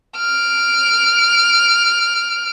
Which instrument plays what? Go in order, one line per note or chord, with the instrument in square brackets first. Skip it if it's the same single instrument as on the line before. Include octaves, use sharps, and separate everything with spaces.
[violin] F6 D7